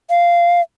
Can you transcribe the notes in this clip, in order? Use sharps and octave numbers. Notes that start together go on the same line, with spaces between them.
F5